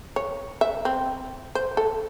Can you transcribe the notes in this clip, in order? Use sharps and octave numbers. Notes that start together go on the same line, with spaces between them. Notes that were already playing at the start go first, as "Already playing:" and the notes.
C#5
E5
C4
C5
A4